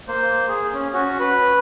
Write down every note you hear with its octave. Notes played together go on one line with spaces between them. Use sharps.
A#3 C5
G#4
C#4
C#4 F#4
B4